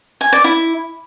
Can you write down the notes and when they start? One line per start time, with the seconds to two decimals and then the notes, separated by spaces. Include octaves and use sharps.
0.21 G#5
0.33 D5
0.44 E4